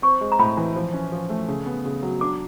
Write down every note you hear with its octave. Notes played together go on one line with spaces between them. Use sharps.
C4 C#6
G#3
A#5
A2 B5
E3
F3
C#4
F3
A3
C#3
B3
C#3
F#3
D4 D6